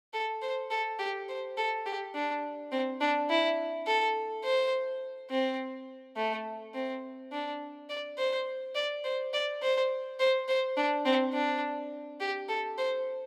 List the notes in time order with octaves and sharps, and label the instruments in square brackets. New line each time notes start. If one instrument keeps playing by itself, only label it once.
[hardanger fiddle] A4
C5
A4
G4
C5
A4
G4
D4
C4
D4
E4
A4
C5
C4
A3
C4
D4
D5
C5
D5
C5
D5
C5
C5
C5
D4
C4
D4
G4
A4
C5